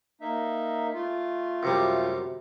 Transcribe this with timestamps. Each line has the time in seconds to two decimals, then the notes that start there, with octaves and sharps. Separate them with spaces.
0.21 A#3 D#4 E5
0.94 A3 F4
1.63 F#2 C3 G3